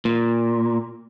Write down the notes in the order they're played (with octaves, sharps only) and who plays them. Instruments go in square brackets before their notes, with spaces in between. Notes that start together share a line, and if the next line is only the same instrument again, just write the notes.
[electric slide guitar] A#2